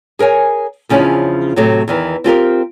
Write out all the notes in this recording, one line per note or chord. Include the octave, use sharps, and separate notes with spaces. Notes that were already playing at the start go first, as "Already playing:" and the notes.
G#4 A#4 C#5 G#5
E2 C#3 F3 C#4 D4 E4
A2 C3 F#3 A3
E2 D#3 E3
C4 F4 G4 A#4